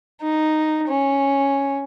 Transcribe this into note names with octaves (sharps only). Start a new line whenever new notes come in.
D#4
C#4